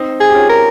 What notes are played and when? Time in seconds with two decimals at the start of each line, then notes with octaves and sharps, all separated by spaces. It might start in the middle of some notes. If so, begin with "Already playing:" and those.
Already playing: C4 D#4
0.20 G#4
0.29 G4
0.35 C#4 F4
0.49 A#4